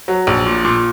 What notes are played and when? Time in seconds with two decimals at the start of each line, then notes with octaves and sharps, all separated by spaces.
0.08 F#3
0.27 A#1
0.46 A#2
0.65 A#2